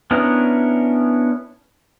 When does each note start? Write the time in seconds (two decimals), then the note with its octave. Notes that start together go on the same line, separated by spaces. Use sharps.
0.11 B3 C#4 D4 E4 A#4